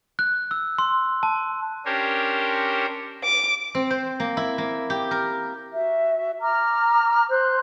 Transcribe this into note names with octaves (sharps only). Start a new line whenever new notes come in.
F#6
E6
C6
A5
C#4 D4 G4 A#4 C5 C#5
D6
C4
C5
A#3
E4
A#3
G4
A#4
F#4 E5
A#5 D6 F6
C5 C6 F#6